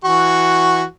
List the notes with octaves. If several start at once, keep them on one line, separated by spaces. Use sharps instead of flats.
E3 F#4 C#6